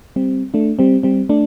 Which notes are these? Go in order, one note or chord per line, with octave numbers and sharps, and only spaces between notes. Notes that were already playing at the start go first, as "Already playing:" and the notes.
G3 C4
A3 D4
G3 C4
G3 C4
A3 D4